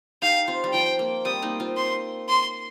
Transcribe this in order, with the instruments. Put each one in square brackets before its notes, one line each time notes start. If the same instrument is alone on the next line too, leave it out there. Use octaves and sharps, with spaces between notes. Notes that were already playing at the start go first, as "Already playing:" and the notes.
[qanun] D#4 G4 [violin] F5
[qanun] C4 F4
G3
[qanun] F3 [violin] G5
[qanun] A#3
[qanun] G3 C4 [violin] D#6
[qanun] A#3 D#4
C4 F4
[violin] C6
C6